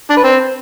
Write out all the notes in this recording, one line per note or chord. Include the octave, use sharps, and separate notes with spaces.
D4
B4
C4